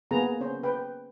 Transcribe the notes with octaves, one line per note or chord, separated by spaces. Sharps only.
A#3 B3 G#4 B4 A#5
C#4 C5
B4 G5